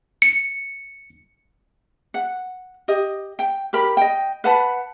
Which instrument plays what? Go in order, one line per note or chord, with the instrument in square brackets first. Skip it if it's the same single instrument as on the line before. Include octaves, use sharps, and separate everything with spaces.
[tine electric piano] C#7
[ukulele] F#5
G4 D#5
G5
G4 A#4 B5
D#5 G5
B4 F#5 A5 B5